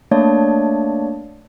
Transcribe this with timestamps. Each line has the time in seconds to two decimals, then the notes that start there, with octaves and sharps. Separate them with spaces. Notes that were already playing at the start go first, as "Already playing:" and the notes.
0.11 A3 A#3 D4 C#5 D5 A5